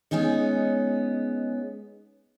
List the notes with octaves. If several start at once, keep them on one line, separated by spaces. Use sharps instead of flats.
G#3 B3 C#4 D#4 C#5